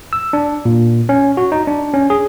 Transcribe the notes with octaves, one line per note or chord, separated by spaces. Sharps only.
E6
D4
A#2
C#4
F#4
D#4
D4
C#4
G#4